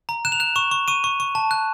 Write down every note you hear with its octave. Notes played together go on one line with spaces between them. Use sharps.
A#5
F#6 E7
F7
F#6 E7
C#6 E7
C#6
C#6 D#7
C#6
C#6
A5
F#6